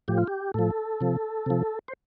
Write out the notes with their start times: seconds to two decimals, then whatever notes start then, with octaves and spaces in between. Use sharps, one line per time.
0.08 A2 F3 G4
0.18 F4
0.28 G4
0.54 A2 F3 A4
1.01 C3 F3
1.46 C3 F3
1.88 C5